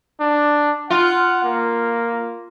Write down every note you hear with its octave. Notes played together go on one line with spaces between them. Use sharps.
D4
F4 F#5
A#3